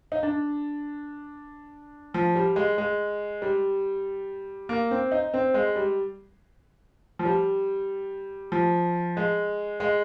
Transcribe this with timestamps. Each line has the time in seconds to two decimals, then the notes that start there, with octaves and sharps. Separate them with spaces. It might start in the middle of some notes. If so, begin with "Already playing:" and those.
0.12 D#4
0.23 D4
2.14 F3
2.35 G3
2.56 G#3
2.78 G#3
3.42 G3
4.69 A#3
4.91 C4
5.12 D#4
5.34 C4
5.54 G#3
5.76 G3
7.19 F3
7.25 G3
8.52 F3
9.17 G#3
9.80 G#3